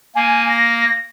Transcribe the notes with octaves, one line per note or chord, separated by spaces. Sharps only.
A#3 G#5
A#6